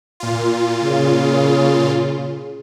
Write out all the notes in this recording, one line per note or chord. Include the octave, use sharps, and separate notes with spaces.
A#2 F4
C#3